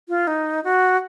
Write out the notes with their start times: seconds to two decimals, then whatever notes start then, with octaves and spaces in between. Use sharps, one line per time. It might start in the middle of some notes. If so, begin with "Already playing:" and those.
0.09 F4
0.27 D#4
0.64 F#4